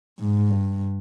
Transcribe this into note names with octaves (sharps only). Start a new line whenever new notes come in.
G#2
G2